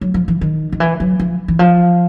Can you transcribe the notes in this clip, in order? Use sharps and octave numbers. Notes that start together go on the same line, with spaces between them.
F#3
F3
E3
D#3
D#3
E3
F#3
F3
E3
F3